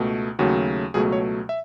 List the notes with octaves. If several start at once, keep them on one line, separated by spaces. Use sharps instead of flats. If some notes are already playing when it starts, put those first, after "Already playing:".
Already playing: C#2 B2 A3
D#2 C#3 F#3 A3 F#4
C#2 B2 F#3 A3 G#4
C#5
E5